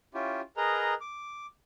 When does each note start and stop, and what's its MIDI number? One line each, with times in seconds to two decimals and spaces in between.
0.14 0.41 61
0.14 0.41 64
0.14 0.41 65
0.14 0.41 67
0.57 0.94 68
0.57 0.94 70
0.57 0.94 71
0.57 0.94 75
0.57 0.94 82
1.01 1.46 86